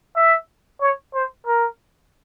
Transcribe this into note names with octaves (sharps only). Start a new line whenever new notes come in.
E5
C#5
C5
A#4